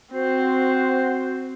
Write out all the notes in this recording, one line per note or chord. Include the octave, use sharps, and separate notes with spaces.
C4 F#4 C5